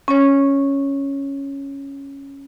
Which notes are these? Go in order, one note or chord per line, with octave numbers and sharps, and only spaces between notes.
C#4 C#5